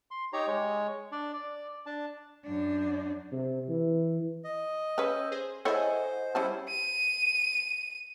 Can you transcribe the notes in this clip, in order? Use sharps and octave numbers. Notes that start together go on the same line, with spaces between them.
C6
D#4 G4 C#5 A#5
G#3 C#5
D4 D5
D5
D4 A5
F#2 D4
C3
E3
D#5
C#4 B4 E6 G6
G#4 C5
E4 A4 C5 C#5 D#5 F#5 G#5
G3 C#4 E4 C5 A5
D#7